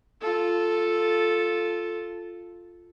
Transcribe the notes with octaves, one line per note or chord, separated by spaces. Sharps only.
F4 A4